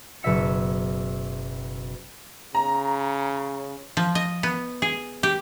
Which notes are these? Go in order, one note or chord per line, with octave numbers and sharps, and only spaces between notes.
F#1 B2 E5 C#7
C#3 A#5
F3
D#5
B3
G#4
G4